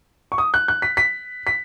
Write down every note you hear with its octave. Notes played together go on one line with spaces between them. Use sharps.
C#6
D#6
F#6
F#6
B6
B6
B6